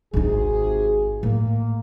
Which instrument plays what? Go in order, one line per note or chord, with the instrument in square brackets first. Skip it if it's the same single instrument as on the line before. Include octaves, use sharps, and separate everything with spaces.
[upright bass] G#1 D#4 [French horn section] C3 F#4 G#4
[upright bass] A2 [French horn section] A#3